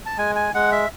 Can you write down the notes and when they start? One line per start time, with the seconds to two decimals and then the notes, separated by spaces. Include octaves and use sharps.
0.06 A5
0.18 G#3 G#5
0.35 G#5
0.54 G#3 F#5
0.72 E5